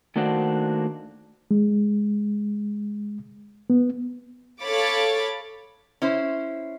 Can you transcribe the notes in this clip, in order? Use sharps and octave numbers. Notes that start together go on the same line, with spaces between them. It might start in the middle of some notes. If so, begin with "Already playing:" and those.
D#3 A3 A#3 D4 F#4 C5
G#3
B3
A4 C#5 F5 B5 D6 A6
C#4 E4 C5